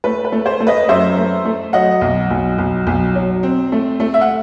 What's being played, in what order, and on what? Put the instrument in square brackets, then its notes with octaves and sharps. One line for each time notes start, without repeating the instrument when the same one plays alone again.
[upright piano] A3 B4
B4
A3
C5
A3
B4 D#5
F#2 C5 E5
A3
A3
F#3 D#5 F#5
B1
B1
B1
B1
F#3
C4
A3
A3
E5
F#5